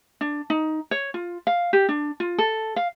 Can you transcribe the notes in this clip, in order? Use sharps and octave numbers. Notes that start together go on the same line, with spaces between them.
D4
D#4
C#5
F4
F5
G4
D4
F4
A4
F5